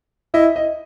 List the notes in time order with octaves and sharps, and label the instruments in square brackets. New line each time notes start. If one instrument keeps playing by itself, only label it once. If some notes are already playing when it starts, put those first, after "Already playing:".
[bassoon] E4 [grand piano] D#5
[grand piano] D#5